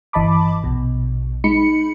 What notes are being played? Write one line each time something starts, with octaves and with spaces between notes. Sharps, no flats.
G1 E3 D#5 A5 B5 D6
A#1 B2
G#3 D#4 B5 C#7